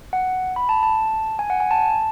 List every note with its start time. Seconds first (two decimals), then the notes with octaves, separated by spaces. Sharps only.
0.13 F#5
0.56 B5
0.69 A5
0.83 A5
1.39 G#5
1.50 F#5
1.60 G#5
1.71 A5